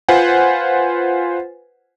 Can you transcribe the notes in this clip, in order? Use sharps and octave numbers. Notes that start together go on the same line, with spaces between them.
F4 B4 C5 F#5 G#5